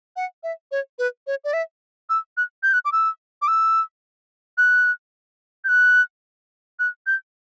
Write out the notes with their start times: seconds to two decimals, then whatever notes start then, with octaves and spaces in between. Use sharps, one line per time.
0.16 F#5
0.43 E5
0.72 C#5
0.99 B4
1.27 C#5
1.44 D5
1.53 E5
2.10 E6
2.37 F#6
2.63 G6
2.73 F#6
2.85 D6
2.92 E6
3.42 D6
3.48 E6
4.58 F#6
5.64 G6
5.68 F#6
6.79 F#6
7.07 G6